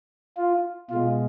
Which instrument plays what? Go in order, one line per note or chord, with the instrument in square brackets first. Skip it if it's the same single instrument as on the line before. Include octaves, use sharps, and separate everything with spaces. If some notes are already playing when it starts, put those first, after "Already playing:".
[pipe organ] F4
B2 G#3 F4